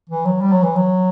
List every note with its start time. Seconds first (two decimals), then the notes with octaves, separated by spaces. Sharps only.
0.09 E3
0.25 F#3
0.41 G3
0.52 F#3
0.63 E3
0.75 F#3